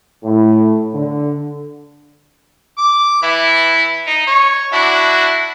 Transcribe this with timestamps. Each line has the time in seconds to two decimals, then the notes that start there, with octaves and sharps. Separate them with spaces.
0.24 A2
0.95 D3
2.78 D6
3.23 E3 E4
4.07 D#4
4.27 C#5
4.73 D4 E4 F#4